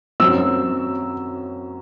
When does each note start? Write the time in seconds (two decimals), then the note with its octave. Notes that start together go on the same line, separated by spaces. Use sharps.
0.20 F#2 F#3 C4 E6